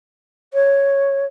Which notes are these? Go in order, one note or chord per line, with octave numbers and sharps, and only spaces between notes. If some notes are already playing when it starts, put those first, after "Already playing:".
C#5